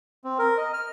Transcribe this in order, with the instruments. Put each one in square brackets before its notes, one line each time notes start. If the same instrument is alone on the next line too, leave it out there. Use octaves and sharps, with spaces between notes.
[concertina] C4
A#4
D#5
F6